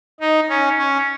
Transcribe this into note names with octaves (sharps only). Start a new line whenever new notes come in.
D#4
C#4
C#4